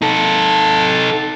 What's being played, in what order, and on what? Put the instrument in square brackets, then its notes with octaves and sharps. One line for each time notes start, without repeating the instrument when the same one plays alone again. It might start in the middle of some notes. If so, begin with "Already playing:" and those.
[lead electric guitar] D#4 A4